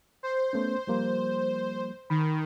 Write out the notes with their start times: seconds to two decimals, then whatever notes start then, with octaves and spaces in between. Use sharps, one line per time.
0.23 C5
0.53 A3 B3 C#4
0.87 F3 G3 A#3
2.10 D#3 B5